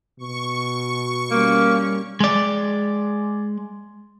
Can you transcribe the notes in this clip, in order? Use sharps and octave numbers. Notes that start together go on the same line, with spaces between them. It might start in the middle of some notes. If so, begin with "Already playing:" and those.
B2 C#6
G3 A#3 C#4
G#3 D5